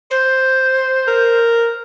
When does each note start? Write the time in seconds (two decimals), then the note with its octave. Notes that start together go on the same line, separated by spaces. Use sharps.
0.10 C5
1.08 A#4